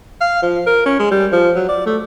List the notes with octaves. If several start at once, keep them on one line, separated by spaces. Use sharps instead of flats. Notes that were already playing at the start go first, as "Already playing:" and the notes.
F5
F3
A#4
C#4
G#3
G3
F3
F#3
D5
A3